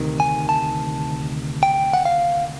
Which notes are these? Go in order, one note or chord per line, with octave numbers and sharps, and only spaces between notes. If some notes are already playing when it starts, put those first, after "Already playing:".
Already playing: D2 C3 D#3
G#5
A5
G5
F#5
F5